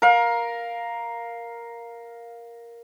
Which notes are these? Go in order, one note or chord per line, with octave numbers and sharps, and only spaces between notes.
A#4 F5